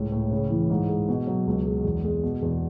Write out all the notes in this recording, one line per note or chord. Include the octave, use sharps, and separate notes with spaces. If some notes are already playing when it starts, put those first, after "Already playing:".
Already playing: C#2 A2
A2
C#3
E3
G#2
G#3
B2
F#3
C#2
G#3
E2
G#3
B2
E2